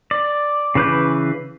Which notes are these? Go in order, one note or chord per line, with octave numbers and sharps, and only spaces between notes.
D5
C#3 E3 B4 D6 G6